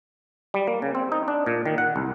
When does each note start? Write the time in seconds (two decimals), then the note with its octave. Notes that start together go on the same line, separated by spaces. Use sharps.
0.54 G3
0.67 A#3
0.82 C#3
0.95 C4
1.12 D#4
1.28 D4
1.46 A#2
1.65 D#3
1.78 F#5
1.96 C2